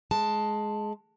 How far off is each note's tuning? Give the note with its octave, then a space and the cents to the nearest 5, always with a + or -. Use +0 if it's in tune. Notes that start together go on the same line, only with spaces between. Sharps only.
G#3 +15 A5 +0